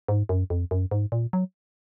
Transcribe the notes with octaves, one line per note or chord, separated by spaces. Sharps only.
G#2
F#2
F2
F#2
G#2
A#2
F#3